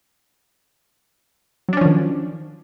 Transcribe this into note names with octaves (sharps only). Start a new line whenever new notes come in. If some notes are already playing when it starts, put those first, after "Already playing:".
D#3 F3 F#3 C#4 D4